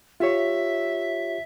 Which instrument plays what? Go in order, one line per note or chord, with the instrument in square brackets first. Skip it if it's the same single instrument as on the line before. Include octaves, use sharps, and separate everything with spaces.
[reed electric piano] F4 G4 C#5 [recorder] E5